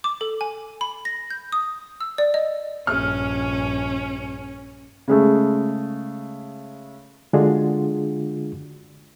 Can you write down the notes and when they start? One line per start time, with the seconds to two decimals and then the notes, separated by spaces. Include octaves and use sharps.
0.04 D6
0.21 A4
0.41 G#5
0.81 B5
1.05 A#6
1.30 G6
1.52 D#6
2.01 E6
2.18 D5
2.34 D#5
2.87 A#1 G2 C#4 F6
5.08 C#3 G#3 A3
7.33 D3 G#3 D4 F4 F#4 G#4